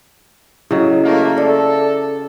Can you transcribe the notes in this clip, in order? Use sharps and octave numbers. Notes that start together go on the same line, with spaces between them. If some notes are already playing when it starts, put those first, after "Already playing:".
C#3 F#3 E4 G4 D#5
A3 A#3
A4 D5 E5